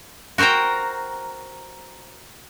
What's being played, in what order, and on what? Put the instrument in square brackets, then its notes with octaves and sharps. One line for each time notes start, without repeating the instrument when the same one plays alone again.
[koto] F#4 A#4 C5 G5 A#5